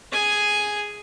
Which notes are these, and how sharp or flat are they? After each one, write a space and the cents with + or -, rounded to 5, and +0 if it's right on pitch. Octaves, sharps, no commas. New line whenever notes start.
G#4 +0 G#5 +0